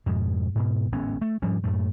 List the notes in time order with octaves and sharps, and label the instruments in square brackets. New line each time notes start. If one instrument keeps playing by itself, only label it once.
[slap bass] F2 G#2 B2
G#2 B2
G#1 A2 B3 C#4
A3
G#2 F3 G3 C#4
F#2 A2 A3